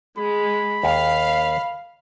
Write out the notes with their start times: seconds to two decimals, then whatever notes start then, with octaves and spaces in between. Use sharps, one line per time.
0.18 G#3 B5
0.83 D#2 F5